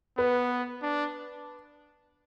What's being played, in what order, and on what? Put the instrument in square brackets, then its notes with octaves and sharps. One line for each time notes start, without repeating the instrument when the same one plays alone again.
[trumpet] B3 [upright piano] B4
[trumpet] D4